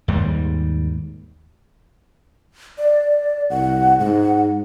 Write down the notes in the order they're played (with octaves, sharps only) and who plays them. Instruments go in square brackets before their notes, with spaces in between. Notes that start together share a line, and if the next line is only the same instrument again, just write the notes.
[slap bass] D#2 G#2 G3
[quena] D5
[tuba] C2 [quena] F#5
[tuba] G#2 [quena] F#5